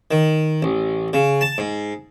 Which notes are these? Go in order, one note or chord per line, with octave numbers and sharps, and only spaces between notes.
D#3
A1
C#3
A5
G#2